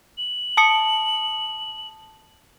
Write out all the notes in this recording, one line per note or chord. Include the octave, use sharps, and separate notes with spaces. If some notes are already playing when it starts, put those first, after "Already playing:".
F#7
A5 D#6 C#7